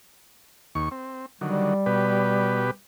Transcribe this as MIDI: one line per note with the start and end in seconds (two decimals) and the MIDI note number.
0.75 0.89 39
0.75 0.89 85
0.91 1.26 60
1.41 1.74 50
1.41 1.74 51
1.41 1.74 54
1.41 2.75 55
1.86 2.71 47
1.86 2.71 67
1.86 2.71 71